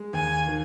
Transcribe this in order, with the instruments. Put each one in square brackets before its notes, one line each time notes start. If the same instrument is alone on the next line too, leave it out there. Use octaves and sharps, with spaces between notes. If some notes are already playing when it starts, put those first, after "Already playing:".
Already playing: [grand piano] G#3
[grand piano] D#2 [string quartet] G#5
[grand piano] D#3